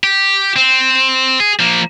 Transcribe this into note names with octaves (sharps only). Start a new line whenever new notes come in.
G4
C4
G#4
F3 A#3